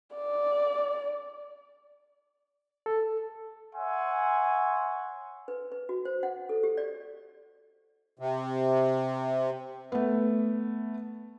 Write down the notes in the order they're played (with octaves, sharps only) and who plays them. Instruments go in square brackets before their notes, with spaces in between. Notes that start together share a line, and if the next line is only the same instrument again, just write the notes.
[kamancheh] D5
[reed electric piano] A4
[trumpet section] C#5 E5 F#5 G#5 C6
[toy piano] B4
B4
F#4
C5
F#5
A4
G4
D5
[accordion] C3
[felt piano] A3 B3